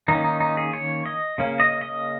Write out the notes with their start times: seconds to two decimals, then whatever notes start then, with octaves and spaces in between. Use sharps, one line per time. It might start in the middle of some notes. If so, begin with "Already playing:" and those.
0.08 D#3 A#3 C#4 D#4
0.24 D#4
0.40 D#4
0.57 G#4
0.73 C#5
1.06 D#5
1.38 C#3 A#3 C#4
1.60 D#5
1.81 D#5